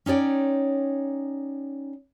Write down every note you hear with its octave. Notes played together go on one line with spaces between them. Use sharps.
C#4 D#4 C#5 D5 G5